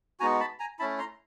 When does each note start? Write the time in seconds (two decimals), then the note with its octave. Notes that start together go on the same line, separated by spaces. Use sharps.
0.20 G#3 B3 D#4 F#4 G#5 A#5
0.40 A5 B5
0.59 G#5 A#5
0.79 A3 C#4 E4 A5 B5
0.98 A#5 C6